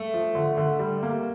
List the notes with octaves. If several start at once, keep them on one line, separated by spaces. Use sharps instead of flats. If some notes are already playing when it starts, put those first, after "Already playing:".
Already playing: A3
F3
D3
D3
G3
A#3